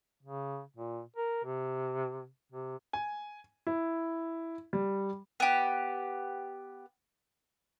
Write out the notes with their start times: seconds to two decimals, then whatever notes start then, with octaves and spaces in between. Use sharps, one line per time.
0.23 C#3
0.77 A#2
1.16 A#4
1.44 C3
2.52 C3
2.93 G#5
3.67 E4
4.73 G3
5.40 B3 G4